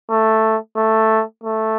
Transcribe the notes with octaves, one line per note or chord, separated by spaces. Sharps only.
A3
A3
A3